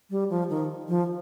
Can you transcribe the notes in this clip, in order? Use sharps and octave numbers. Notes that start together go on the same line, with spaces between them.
G3
F3
D#3
F3